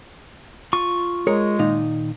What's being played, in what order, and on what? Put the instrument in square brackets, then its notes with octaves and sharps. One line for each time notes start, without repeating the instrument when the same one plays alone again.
[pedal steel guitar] F4 C#6
[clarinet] G#3 [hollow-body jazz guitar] G#4 A#4 C#5
[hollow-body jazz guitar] A#2 D#3 D#4